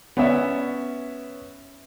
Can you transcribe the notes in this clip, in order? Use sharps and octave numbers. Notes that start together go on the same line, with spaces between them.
B3 C#4 C#5 D5 E5